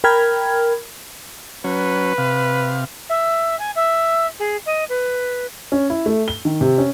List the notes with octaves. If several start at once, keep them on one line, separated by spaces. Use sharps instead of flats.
A#4 G5 B5 F6 G#6
F#3 C#4 B4
C3 F5
E5
G#5
E5
G#4
D#5
B4
C#4
E4
A3
G7
D#3
C3
C#4